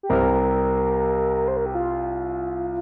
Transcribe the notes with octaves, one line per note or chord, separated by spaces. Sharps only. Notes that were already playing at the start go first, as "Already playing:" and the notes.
G4
C2 C3 G3 C4 A#4
C5
A#4
G4
F4